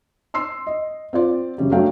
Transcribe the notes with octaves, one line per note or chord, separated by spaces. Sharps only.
C6 E6 C7
D#5
C4 F4 D5
F#2 C#3 G3
F#3 A3 D4 F5 G5